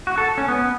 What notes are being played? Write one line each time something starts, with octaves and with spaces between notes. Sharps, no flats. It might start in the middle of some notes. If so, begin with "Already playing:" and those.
F#4
A4
C#4
B3